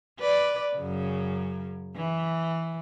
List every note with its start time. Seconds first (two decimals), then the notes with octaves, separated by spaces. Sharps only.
0.20 B4 D5
0.77 F#2 C#3
1.96 E3